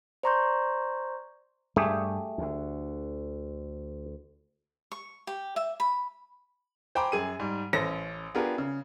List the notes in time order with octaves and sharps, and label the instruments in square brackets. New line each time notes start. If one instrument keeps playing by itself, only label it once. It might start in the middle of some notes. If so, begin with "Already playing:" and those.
[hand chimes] C5 D5 A#5 C6 C#6 G6
[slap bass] G2 G3 [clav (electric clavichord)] A3 G4 G#4
[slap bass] D2 D3
[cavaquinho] C#6
G4
E5
B5
[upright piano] C5 G5 G#5 A#5 B5 D6
F#2 G#4 D#7
G#2 G3
A1 C#4 A4 C5 A#6
B3 D4 F4 G4 G#4 A#4
C#3